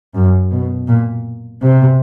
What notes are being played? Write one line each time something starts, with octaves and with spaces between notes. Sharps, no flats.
F#2
B2
A#2
C3